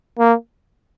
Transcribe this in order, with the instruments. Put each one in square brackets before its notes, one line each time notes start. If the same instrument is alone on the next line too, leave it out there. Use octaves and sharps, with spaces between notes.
[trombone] A#3